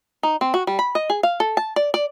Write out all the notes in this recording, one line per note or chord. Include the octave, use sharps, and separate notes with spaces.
D#4
C4
F#4
G3
B5
D#5
G#4
F5
A4
A5
D5
D5